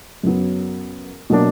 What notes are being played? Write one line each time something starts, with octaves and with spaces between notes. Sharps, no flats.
F#2 C#3 F#3 B3
B2 F#3 A#3 D4